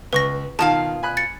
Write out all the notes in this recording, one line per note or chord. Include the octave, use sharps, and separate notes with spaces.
C#2 B4 C#6 A#6
B2 D#3 F4 F5 A5 E7
G#5 B5 F#6
A6 C#7